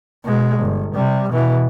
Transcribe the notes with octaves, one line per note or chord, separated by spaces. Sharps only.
B2 G#3
G1
C3 G3
B2 E3